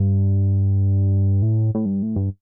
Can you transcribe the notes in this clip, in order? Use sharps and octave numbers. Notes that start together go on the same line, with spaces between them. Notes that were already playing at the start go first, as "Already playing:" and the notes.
Already playing: G2
A2
A2
G2
A2
G2